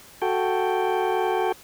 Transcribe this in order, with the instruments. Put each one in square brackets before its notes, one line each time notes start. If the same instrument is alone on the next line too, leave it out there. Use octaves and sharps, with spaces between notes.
[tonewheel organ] F#4 A4 G5